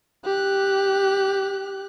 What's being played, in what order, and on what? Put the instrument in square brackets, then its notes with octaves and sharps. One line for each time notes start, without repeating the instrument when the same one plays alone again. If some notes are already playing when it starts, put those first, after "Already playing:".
[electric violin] G4 F#6